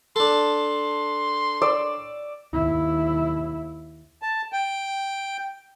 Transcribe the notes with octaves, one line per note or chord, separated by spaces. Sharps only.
D4 A4 C6
D5 E6
D#2 E4
A5
G5